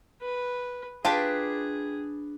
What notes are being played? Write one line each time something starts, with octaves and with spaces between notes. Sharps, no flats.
B4
D4 F4 G4 G#4 B4 D5 A5